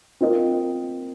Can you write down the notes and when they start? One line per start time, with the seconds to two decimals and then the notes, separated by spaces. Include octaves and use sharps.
0.21 C4 F4 A#4 D#5